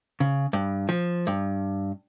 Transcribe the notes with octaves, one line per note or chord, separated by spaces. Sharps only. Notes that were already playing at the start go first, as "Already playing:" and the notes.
C#3
G2
F3
G2